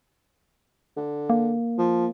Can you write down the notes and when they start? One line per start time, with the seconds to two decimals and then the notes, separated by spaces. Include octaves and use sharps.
0.97 D3
1.30 A#3
1.78 F3